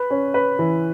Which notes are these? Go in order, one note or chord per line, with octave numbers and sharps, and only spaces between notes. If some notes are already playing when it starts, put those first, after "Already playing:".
Already playing: B4
C#4
B4
E3